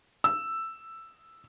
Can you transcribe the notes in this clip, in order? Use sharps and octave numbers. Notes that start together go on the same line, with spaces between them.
E6